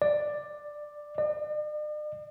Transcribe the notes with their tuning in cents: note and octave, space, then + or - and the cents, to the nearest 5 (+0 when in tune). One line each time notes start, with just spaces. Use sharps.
D5 +10
D5 +45